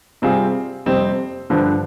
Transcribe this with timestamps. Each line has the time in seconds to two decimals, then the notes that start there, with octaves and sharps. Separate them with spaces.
0.22 C3 G3 C4 F4 G#4
0.86 F2 C3 G3 C4
1.50 G2 D3 F3